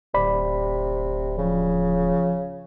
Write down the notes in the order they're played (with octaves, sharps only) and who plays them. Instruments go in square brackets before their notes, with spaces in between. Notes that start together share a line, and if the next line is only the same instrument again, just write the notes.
[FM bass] D1 [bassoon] C3 [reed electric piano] D5 B5
[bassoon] C#3 [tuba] F3